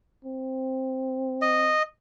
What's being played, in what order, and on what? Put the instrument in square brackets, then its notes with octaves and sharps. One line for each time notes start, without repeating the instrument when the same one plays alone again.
[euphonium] C4
[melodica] D#5